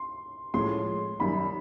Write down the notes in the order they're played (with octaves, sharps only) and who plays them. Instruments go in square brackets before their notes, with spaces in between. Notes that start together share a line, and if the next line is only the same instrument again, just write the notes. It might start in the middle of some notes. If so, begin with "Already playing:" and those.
Already playing: [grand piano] C6
[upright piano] A2 F3 G#3 C#4 [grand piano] C6
[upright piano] F#2 D#3 G3 [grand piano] B5